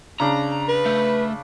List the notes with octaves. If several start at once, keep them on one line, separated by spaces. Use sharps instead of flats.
C#3 D4 A#5
B4
A3